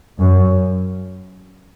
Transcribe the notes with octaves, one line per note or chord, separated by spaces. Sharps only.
F#2